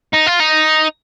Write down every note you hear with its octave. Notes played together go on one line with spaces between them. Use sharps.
D#4
F4
D#4